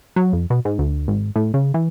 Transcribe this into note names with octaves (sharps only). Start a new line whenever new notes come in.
F#3
F2
B2
G#2
D2
G#1
A2
C#3
E3